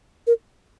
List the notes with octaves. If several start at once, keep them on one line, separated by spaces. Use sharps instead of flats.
A#4